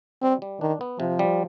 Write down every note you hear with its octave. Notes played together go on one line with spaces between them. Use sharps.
G3 C4
G3
D#3 D4
B3
C3 F3
G3